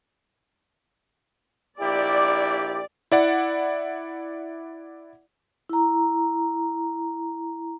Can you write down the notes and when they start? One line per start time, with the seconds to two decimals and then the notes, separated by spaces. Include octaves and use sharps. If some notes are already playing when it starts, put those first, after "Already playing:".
1.80 A#1 E4 G4 D5
3.12 E4 D5 F#5
5.69 E4 A#5